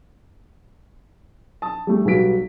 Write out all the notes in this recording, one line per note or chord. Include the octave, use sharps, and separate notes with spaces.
A5 D#6
G3 A3
B1 F#3 G3 B4 B6 D7